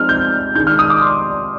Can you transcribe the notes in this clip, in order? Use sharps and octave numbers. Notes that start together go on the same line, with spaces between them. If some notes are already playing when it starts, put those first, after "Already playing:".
Already playing: F3 G#3 C4 D#4 F6
G6
D#3 G#3 D#4 G6
F6
D#6
D6
C6